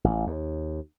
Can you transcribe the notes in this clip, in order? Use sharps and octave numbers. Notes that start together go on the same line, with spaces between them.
A1
D#2